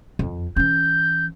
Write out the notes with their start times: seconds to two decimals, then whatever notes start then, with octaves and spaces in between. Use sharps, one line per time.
0.19 F2
0.56 E3 C#4 G6